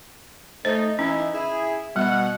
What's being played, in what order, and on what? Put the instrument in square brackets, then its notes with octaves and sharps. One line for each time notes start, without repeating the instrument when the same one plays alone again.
[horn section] A3 D#4 [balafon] C5
[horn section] E3 D#4 E4 [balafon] C#4
[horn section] E4 G#4
[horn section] B2 F#5 [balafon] G3